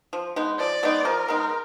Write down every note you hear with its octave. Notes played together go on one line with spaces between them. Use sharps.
F3
G#3 B3 D#4
F3 D5
G#3 B3 D#4
F3 A#4
G#3 B3 D#4